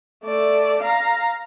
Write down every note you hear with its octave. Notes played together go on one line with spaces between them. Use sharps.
A3 D5
F5 A#5